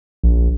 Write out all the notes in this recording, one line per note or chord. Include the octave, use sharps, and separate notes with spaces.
A#1